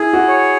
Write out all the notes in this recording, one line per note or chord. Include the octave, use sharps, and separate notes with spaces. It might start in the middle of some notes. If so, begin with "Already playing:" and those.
Already playing: E4 G#4
F#4
C#5